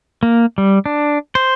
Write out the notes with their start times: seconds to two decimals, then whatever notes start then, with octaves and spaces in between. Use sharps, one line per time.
0.23 A#3
0.58 G3
0.86 D4
1.35 C5